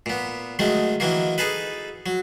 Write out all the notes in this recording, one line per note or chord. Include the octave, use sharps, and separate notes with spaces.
A#2 B3
D#3 F#3 G#3 A3
D#3 E3 F#3 A#3
D#4 G#4 A4 B4
F#3